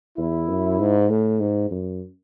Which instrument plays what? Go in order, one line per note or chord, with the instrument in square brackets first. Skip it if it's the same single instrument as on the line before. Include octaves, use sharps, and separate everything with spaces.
[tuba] E2 [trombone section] E4
[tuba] F#2
G#2
A2
G#2
F#2